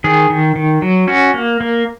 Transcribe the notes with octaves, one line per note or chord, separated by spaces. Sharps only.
D#3 G#4
D#3
D#3
F#3
C#4 F#4
A#3
A#3